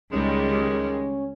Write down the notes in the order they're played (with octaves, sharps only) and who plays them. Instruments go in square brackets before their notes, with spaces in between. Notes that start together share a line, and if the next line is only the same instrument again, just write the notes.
[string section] C#2 G3 [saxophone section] D#3 G#3 [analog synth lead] C#4